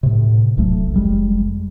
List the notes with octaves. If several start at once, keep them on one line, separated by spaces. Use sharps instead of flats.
A2 C3
D1 B1 F#3 A3
F1 G3 G#3